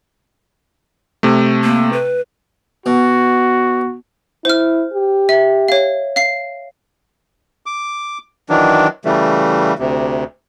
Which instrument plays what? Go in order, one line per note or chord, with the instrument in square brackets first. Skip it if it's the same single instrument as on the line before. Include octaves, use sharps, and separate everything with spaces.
[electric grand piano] C3 A3
[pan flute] A#3
B4
[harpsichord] B2 [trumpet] F#4
[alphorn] E4 [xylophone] C5 F6
[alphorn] G4
[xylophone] E5
C#5 F5
F5 C7
[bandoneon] D6
D#3 E3 F#3 D4
C#3 E3 G3 A3
D2 C3